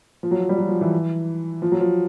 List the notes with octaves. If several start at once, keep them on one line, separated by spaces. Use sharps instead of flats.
F3
F#3
F3
G3
F#3
F3
E3
F3
F#3
F3